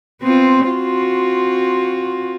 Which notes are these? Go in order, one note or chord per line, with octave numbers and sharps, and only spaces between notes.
B3 C4 F4
C4 F4 F#4